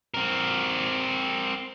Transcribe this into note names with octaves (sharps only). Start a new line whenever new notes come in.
C4 A#4